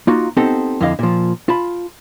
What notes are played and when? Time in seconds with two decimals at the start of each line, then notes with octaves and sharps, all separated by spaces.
0.07 A#3 D#4 F4 F#4
0.37 B3 C4 D#4 G4 A4 C5
0.81 F2 D3 E4 D#5 F5
0.99 A#2 F3
1.49 F4 A5 B5